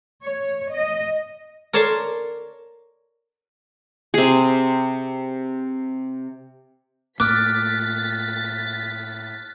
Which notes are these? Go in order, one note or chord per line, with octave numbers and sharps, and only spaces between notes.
C#5
D#5
A#4 C#5 D5 A5 C6
C3 G#4
A2 A#3 D6 F6 F#6 A6 B6